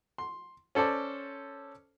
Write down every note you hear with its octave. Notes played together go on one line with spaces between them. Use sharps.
C6
C#4 A4 C5 D5